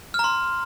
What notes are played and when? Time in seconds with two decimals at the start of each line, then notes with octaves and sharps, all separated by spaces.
0.14 F6
0.19 A#5
0.24 C6